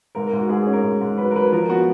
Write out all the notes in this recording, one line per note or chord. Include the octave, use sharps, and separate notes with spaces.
G#2 A#4
A#4
G#2
F#4
G#2 G#4
G#4
C#4
A#4
G#2
G#2
F#3 B4
A#4
F#3 B4
F3 A#4
B3 F#4